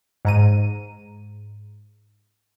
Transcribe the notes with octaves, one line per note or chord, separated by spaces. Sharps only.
G#2 A#5 D#7